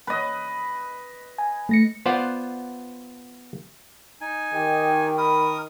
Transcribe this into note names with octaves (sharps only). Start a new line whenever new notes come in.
B4 D#5
G#5
A3 A#6 C#7
B3 F4 C5 D5 F#5
D#4 G#5
D#3 G4
A#4 B5 D#6